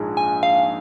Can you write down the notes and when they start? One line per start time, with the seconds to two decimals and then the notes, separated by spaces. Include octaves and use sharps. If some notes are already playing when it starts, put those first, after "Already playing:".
Already playing: A#1 G#2 G#3
0.17 G#5
0.43 F5